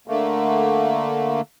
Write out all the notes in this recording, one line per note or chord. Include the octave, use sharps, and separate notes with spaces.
D3 A3 A#3